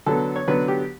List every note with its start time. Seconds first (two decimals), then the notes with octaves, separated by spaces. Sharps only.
0.06 D3 F#3 B3 A4
0.36 C#5
0.48 D3 F#3 B3 B4
0.68 G4